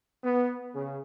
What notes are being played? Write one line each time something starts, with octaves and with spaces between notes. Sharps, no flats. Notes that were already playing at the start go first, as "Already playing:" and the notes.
B3
C#3